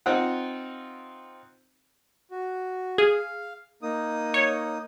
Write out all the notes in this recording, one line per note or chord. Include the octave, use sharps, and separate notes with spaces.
C4 D#4 F4 F#5
F#4
G#4 F5
A#3 D#4 D#6
C#5